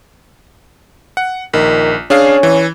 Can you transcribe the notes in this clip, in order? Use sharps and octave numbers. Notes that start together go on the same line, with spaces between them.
F#5
A#1 D#3
C#4 D4 G#4 F5
E3